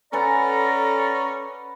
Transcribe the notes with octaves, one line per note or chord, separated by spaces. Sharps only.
C#4 A4 B4 D5 F#5 G#5 A#5